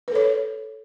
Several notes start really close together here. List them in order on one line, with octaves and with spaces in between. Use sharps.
B4 A4 C#5